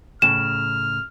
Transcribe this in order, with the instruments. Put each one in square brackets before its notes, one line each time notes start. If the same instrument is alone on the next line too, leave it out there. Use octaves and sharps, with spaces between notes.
[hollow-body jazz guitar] A2 C#3 [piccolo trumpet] F6 [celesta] E7